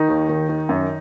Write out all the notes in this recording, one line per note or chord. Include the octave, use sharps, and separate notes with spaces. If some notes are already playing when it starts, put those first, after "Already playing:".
Already playing: D#3 D#4
D#2
D#3
D#3
F#2